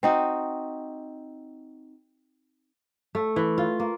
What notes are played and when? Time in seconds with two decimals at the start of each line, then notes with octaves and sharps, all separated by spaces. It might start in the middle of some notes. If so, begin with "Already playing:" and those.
0.03 C4 D#4 F#4
3.15 A3
3.36 E3
3.58 F4
3.80 A#3